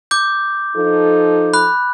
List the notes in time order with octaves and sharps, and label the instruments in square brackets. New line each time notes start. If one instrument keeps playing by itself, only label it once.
[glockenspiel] D6 G6
[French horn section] F3 D#4 A4
[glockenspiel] B5 F#6